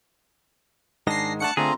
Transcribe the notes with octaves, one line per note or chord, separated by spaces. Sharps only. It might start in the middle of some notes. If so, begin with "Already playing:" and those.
G#2 D#3 G#3 D4 A#6 C7
A3 D4 F#5 A5 F#6 C#7
D3 A3 C4 F4 G#4 A#5